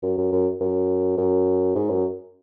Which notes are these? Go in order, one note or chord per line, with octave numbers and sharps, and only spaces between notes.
F#2
F#2
F#2
F#2
F#2
G#2
F#2